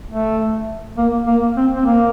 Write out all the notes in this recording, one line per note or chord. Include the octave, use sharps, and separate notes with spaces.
A3
A#3
A#3
C4
C4
A#3